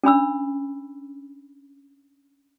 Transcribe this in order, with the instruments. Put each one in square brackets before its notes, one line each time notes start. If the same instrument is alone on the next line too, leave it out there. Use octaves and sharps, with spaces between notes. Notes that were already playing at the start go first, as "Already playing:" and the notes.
[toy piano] C#4 D4 B5 E6